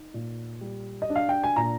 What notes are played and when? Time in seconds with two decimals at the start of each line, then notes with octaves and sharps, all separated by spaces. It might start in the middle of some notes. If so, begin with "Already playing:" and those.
Already playing: D#4
0.14 A#2
0.61 G3
1.02 D#5
1.10 D4
1.15 F5
1.29 G5
1.43 G#5
1.56 A#2 A#5